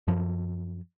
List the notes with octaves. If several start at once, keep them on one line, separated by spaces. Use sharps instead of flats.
F#2 F3